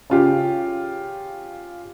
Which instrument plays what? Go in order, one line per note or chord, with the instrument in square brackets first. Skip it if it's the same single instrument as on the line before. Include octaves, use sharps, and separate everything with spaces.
[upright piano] C#3 F4 G4